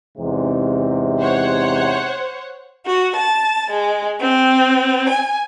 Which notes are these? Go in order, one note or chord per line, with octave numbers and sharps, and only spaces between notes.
E2 G#2 C3
C5 C#5 F#5
F#4
A5
G#3
C4
G#5